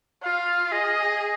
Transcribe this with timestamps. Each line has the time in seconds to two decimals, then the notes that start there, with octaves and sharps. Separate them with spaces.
0.23 F4 F5
0.71 G#4 D#5